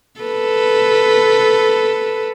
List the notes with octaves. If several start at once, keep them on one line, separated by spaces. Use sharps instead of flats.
A4 B4